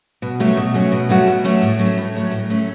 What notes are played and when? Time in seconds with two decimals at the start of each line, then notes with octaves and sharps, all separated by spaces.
0.22 B2
0.40 F#3 A3 C#4 F#4
0.57 B2
0.74 F#3 A3 C#4 F#4
0.92 B2
1.09 F#3 A3 C#4 F#4
1.27 B2
1.44 F#3 A3 C#4 F#4
1.62 A2
1.79 F#3 A3 C#4
1.98 A2
2.15 F#3 A3 C#4
2.31 A2
2.49 F#3 A3 C#4